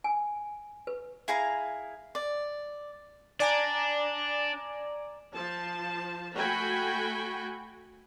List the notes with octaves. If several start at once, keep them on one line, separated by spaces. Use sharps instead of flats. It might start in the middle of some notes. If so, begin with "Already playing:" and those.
G#5
B4
E4 G#4 F5 A#5
D5
D4 D5 G#5 A#5
F3 A5
A3 F#4 G5 G#5 B5